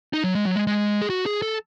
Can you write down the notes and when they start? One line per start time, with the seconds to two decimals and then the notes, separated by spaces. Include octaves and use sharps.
0.13 D#4
0.24 F#3
0.35 G#3
0.45 F#3
0.56 G#3
0.67 G#3
1.02 G#4
1.10 F#4
1.26 G#4
1.42 A4